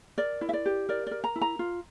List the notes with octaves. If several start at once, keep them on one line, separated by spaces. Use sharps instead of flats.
A#4 D5
E4
E5
D5
G4
A#4 D5
A#4 D5
A#5
E4
A#5
F4